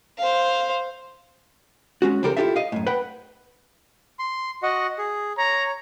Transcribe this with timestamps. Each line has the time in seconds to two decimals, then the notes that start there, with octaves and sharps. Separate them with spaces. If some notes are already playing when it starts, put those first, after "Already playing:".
0.18 C5 F5
2.02 G#3 C#4 F#4
2.23 C#2 F3 G4 A4 A#4
2.37 E4 F4 G4 A4 E5
2.56 D#5 F5
2.72 F#2 A2
2.87 B4 F#5 G5
4.19 C6
4.63 F#4 D#5 F#5
4.98 G#4
5.37 C#5 A#5